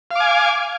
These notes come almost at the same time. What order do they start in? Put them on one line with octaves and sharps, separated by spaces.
F5 D6 G#5